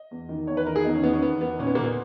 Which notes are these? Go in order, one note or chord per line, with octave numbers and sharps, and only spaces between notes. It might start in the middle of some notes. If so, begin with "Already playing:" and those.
Already playing: D#5
E2
D#3
E2 C#5
B4
D#3 A#4
G#4
E2 D#4
C#4
D#3 B3
C#4
E2 B3
D#3 B3
A#2 C#4
B3
A#3
A#2
B3